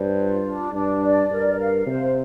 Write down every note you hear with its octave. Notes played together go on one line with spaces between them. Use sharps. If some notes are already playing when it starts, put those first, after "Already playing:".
Already playing: G2 C5
F4
D4
G2 D4
D5
G2 A#4
F5
C3 C5